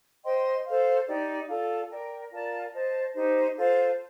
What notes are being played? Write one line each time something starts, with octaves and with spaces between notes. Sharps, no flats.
C5 D#5 G5 C6
A4 C5 F5
D#4 G4 D5
F4 A4 D5
A#4 D5 G5
F4 A#4 D5 A5
C5 D#5 A5
D#4 G4 C5
F4 A4 C5